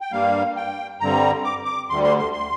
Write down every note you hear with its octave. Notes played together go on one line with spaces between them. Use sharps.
G5
G2 G3 A#3 F5
G5
G2 D3 G3 C4 A#5
D6
D6
D2 D3 G3 C6
C6
C6
C6